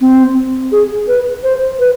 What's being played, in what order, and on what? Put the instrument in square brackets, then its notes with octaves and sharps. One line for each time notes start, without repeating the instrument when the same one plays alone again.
[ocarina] C4
G#4
B4
C5
B4